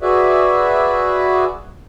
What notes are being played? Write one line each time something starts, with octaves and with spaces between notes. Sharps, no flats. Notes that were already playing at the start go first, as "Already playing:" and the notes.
F#4 G#4 B4 D5 E5